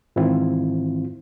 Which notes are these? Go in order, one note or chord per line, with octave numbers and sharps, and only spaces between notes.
G#2 D#3 E3 C4 E4 F4